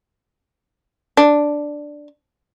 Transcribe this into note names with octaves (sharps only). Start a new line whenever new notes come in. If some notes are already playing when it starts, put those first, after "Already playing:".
D4